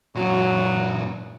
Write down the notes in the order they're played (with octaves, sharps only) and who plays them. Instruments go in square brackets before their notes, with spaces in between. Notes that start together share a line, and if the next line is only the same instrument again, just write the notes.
[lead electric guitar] F#2 A#2 [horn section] F#3